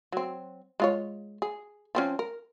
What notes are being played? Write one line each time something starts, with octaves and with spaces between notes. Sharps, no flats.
F#3 C4
G#3 F4 C#5
G#4
F3 C4 C#4
A#4